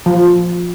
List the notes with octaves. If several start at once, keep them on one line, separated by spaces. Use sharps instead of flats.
F3